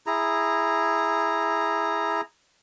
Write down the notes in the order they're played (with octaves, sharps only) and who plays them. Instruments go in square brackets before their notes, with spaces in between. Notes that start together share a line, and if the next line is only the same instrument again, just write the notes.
[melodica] E4 G#4 A#5